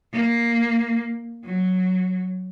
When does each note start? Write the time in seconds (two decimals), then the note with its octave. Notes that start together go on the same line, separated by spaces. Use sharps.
0.13 A#3
1.44 F#3